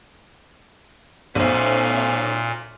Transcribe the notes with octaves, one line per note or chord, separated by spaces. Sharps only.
B1 A#2 A3 C#4 C5 F5